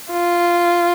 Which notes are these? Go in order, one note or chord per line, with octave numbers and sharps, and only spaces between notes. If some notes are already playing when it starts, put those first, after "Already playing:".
F4